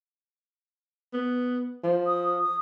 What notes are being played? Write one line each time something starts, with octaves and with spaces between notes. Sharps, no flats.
B3
F3
D#6
D#6